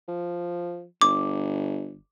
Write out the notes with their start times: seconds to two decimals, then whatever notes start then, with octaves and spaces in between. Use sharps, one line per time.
0.08 F3
1.01 G1 D6